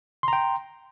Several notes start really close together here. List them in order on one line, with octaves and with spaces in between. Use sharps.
C6 A#5 G5